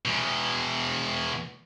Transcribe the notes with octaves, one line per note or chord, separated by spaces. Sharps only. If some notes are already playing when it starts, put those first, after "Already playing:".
E2 B2